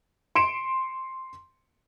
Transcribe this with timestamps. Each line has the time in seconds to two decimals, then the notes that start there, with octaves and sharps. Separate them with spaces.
0.35 C6 C#7 D7 E7